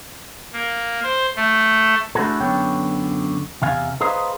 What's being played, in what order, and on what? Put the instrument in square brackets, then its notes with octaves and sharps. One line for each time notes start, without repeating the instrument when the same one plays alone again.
[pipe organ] A#3
C5
A3
[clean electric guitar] A3 D4 E4 F#4 G#4 A4
F#2 D3 B3 C#5 G5
E2 C3 F5 G#5
G#4 B4 C5 D#5 F5 A#5